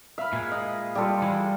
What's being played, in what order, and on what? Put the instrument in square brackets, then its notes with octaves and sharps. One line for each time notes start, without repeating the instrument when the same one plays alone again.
[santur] E5 [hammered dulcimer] F5 B5
[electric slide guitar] A#2 G#3
[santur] D#5
[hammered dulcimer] G3 F4 [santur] G4 A4
[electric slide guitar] E3 G#3